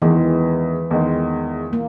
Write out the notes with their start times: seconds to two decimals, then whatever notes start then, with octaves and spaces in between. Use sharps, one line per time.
0.02 E2 D#3 E3 G#3
0.91 E2 D#3 G#3
1.73 A#3